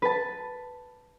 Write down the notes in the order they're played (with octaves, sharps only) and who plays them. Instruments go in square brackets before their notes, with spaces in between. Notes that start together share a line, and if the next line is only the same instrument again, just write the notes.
[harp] B4 A5